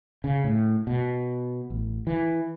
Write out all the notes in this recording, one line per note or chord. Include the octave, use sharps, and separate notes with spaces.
C#3
A2
B2
A1
E3